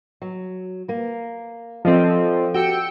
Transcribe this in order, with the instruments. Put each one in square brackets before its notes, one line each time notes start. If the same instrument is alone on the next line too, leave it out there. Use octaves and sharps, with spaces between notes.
[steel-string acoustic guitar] F#3
A#3 A#4
[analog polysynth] F3 C4 [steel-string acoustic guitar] A4 D5 D#5
[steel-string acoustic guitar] F#4 G4 A4 [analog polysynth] G5 E6 C#7